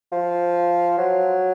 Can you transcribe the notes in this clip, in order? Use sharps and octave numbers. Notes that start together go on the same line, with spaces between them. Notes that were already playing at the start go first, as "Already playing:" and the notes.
F3
F#3